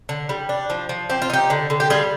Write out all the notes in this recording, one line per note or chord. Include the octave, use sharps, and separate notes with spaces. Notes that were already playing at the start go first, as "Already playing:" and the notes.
D3
G3
D4
F3
F3
C4 G4
F4
D#4 G4
D3
D3
G4
G3 F4 G#4